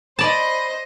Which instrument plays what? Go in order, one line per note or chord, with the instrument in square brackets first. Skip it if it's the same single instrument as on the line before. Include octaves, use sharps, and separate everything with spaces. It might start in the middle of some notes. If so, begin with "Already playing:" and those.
[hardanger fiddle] C5 D#5 [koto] D5 A5 [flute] B5